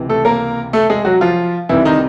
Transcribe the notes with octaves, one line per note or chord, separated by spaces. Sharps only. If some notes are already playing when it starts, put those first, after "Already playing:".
Already playing: C#2 C3 E3
A3 A4
A#3 A#4
A3 A4
G#3 G#4
F#3 F#4
F3 F4
C2 C3 D#3 E3 E4
D#3 D#4